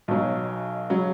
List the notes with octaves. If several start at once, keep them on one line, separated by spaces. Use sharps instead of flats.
B1 B2 F#3
C#3 F#3